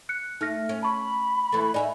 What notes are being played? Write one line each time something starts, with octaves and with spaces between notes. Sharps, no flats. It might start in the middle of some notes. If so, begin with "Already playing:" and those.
F#6 C#7
A3 D#4 F6 A#6
C#4
A5 B5 C#6
E3 A3
D#4 A#4 D5 E5 G#5